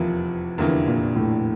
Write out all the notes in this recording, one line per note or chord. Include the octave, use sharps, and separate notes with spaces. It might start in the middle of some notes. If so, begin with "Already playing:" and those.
Already playing: F1 E2 E3 F3 A#3 E4
F1 E2 D3 E3 A#3 E4
A#2
A2